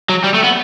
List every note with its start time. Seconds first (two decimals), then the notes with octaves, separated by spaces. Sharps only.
0.09 F#3
0.24 G3
0.34 A3
0.44 B3